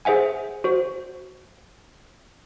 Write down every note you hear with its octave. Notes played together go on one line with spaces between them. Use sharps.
G#4 C5 E5 F#5 G#5
F#4 C5